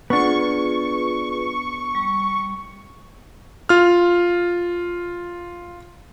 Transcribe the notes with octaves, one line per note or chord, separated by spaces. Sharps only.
B3 D4 F4 G#4 B4 C#6
G3
F4 F6